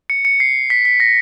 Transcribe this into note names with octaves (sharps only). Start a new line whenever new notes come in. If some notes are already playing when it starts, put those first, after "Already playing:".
C#7
C#7
C7
B6
B6
A#6